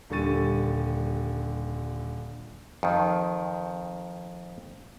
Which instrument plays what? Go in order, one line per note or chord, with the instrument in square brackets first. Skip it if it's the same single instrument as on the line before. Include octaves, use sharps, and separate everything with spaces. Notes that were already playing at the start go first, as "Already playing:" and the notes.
[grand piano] D#1 D3 G3 C#6 A6 D#7
[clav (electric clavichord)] F2 D#3